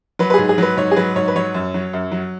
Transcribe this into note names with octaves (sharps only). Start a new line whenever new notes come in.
F#3 B4
B4
G#2 G#4
G#4
F#3 B4
G#2 C#5
G#4
F#3 B4
G#2 C#5
B4
F#3 C#5
F#2
F#3
F#2
F#3